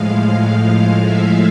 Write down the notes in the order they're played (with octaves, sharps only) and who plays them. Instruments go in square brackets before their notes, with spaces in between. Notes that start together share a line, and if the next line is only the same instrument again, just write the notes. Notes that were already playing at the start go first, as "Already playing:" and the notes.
Already playing: [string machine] A2 F3 G#3 F5
F5
E5